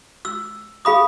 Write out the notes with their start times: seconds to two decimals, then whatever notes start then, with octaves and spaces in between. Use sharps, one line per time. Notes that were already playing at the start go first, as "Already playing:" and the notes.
0.25 E6
0.85 G#4 F5 B5 D#6